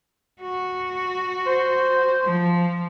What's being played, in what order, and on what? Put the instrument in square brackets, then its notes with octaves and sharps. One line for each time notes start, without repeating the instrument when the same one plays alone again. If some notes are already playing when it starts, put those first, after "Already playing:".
[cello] F#4
[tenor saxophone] C5
[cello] F3